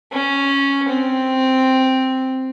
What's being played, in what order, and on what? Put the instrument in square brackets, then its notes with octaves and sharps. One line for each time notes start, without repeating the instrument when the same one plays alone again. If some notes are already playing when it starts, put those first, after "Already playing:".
[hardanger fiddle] C#4
C4